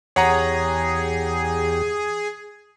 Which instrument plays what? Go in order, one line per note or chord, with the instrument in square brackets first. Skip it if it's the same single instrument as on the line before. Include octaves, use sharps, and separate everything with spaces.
[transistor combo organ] E2 G4 [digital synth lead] G#4 [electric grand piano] C#5 F#5 A#5